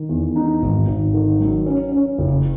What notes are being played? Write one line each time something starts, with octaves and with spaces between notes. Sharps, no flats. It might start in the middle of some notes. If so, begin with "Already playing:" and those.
Already playing: D#3
E2
D#4
G#1
G#1
D#3
F#3
C#4
C#4
F#1